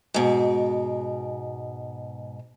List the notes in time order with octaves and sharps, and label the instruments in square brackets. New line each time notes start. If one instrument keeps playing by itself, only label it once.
[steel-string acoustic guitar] G#2 B2